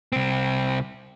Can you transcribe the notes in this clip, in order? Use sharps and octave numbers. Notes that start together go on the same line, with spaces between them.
C2 C4